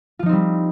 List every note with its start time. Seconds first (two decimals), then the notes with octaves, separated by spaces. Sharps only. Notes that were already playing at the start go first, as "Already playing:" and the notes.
0.19 F4
0.23 F3
0.26 D#4
0.29 C4
0.32 G3